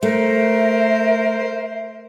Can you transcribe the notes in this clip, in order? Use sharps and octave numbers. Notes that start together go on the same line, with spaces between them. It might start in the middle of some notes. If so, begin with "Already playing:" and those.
A3 A#4 C5 E5